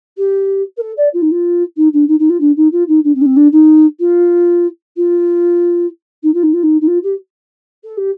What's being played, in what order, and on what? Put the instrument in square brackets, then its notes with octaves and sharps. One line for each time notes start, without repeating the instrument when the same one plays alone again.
[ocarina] G4
A#4
A4
D5
F4
D#4
F4
D#4
D4
D#4
D#4
F4
D4
D#4
F4
D#4
D4
C4
D4
C4
D4
D#4
F4
F4
D#4
F4
D#4
F4
D#4
D#4
F4
G4
A4
G4